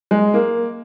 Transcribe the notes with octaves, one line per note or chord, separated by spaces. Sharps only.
G#3
A#3